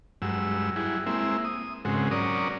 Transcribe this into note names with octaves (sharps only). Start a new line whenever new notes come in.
G2 F#3 G#3 E6
G3 E4 F#4 G#4
G#3 A#3 C4 E4 E5
D#6
G#2 C#3 G#3 C4 F#4
F#3 C#4 A#4 D5 D#6